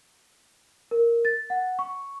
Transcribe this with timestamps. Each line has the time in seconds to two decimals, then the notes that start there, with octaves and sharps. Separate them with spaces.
0.91 A#4
1.25 A6
1.50 F#5
1.79 C#6